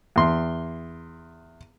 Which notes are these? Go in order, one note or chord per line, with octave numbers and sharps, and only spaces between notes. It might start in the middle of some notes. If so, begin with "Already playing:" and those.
E2 C6